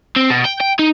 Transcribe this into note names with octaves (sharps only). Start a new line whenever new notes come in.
C4
B2
G5
G5
D#4